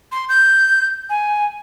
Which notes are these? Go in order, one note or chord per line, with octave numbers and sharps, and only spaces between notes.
C6
G6
G#5